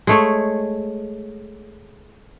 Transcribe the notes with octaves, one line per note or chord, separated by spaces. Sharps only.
G#3 A3 C#5